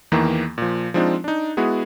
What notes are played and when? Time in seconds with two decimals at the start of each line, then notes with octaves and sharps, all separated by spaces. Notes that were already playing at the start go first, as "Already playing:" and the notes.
0.12 E2 D#3 E3 A#3
0.58 A#2 F3
0.94 F3 G#3 C4 D4 D#4 F4
1.24 D4 D#4
1.57 G#3 B3 E4 F#4 G#4